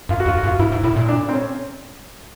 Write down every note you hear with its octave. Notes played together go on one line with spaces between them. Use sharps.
F#2 F4
F#4
F2 F4
F#4
F#2
F4
G2 E4
G#2
A2 E4
A#2
D4
C4
C#4